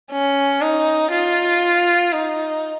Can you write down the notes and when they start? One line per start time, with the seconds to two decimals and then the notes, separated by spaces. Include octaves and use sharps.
0.12 C#4
0.61 D#4
1.12 F4
2.13 D#4